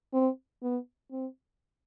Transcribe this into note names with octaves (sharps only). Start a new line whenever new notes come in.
C4
B3
C4